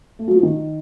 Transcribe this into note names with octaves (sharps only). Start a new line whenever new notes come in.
A3
F#3
F3
D#3